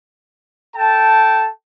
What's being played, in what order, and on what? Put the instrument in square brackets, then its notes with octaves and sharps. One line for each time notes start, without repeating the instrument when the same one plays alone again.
[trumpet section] A4 G5 A5